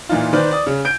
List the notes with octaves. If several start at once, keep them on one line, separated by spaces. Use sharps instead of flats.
A#2 E3 D#4 F4
D#3 B4 C5 D5
D5 D#6
C#3
G6 D7